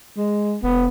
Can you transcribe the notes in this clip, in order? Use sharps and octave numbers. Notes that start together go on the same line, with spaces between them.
G#3
F1 B3